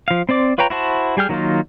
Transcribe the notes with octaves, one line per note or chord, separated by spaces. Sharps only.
F3 F5
C4 C5 D5 D6
F4 B4 C#5 G5 A#5
E4 F#4 C5 A5
G3 G#4 G5 F6
D#3 F#3 A#3 D#4 F4